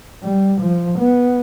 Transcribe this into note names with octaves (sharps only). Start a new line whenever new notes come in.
G3
F3
B3